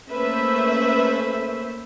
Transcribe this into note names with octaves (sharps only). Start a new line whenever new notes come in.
A3 A#3 C#4 B4 C5 E5